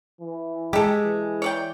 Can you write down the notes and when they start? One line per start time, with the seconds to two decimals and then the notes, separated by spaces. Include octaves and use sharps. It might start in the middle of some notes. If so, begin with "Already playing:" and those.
0.20 E3
0.73 G#3 G4 A4
1.05 E3
1.42 C#5 D5 G5